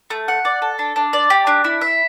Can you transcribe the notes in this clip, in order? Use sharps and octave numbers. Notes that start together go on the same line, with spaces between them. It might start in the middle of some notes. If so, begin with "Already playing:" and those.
A3
F#5
D5
A4
D4
D4
D5
G4
D4
E4
E5